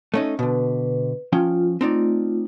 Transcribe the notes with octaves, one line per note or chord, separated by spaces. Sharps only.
A3 C#4 D#4
B2 D3 B4
F3 C#4 F4 G5
A3 C4 D#4 F4 D5